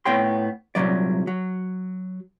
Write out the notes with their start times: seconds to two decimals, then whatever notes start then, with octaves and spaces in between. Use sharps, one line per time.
0.05 A2 B3 C#5 G5 C6
0.75 C2 A#2 D#3 F#3 D5
1.27 F#3